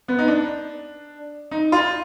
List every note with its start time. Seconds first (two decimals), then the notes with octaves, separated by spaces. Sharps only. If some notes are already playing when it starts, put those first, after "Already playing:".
0.08 B3
0.19 D#4
0.28 D4
1.51 D#4
1.72 F4